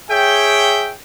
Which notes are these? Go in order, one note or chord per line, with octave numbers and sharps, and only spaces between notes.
G#4 C#5 E5 G5